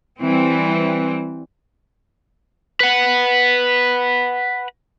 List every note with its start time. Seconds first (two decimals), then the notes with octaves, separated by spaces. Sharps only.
0.20 E3 G3 C4
2.80 B4 F#5